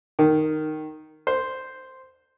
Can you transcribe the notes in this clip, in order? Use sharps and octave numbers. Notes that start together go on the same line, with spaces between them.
D#3
C5